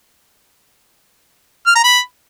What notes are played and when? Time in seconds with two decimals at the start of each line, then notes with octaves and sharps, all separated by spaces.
1.66 F6
1.75 A#5
1.84 B5